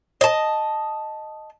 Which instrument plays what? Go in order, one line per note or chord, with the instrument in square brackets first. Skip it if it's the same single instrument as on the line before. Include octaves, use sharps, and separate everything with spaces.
[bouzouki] D#5 A5